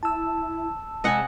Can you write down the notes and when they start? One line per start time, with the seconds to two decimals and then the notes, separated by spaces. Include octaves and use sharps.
0.03 E4 A5 E6
1.04 C3 G#3 D#5 F#5 G#5